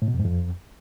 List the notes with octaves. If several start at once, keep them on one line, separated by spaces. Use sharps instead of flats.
A2
B2
F2
G#2
F2